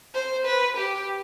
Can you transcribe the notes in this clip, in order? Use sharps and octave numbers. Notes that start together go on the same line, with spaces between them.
C5
B4
G4